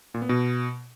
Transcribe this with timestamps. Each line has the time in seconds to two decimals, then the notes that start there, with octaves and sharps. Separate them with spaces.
0.14 A#2
0.22 B3
0.29 B2